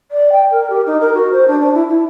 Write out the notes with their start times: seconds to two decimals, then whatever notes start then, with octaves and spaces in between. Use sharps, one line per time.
0.11 D5
0.32 G5
0.51 A#4
0.70 G4
0.87 D#4
1.01 A#4
1.14 F#4
1.32 C5
1.48 D4
1.61 D4
1.75 E4
1.89 E4